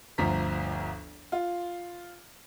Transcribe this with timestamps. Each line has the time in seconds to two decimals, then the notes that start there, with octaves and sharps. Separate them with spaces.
0.18 G1 D2 F3 A#5 B6
1.32 F4